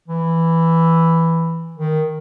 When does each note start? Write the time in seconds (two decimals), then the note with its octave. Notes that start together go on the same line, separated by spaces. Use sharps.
0.08 E3
1.77 D#3